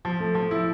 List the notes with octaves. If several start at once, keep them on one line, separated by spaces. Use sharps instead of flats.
F3
A3
F3
E4